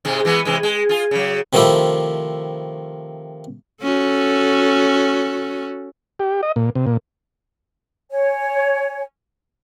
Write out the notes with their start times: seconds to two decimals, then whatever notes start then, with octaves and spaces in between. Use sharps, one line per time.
0.05 G#2 C3 G#3
0.25 E3 G#3 B3
0.45 C3 E3 G#3
0.63 G#3
0.89 F4 G#4
1.11 C#3 F#3
1.53 C3 D#3 F3 A3 E4 G4
3.83 C#4 F#4 A4
6.20 G4
6.43 D#5
6.56 A#2
6.75 C3
6.87 A#2
8.10 C#5 G#5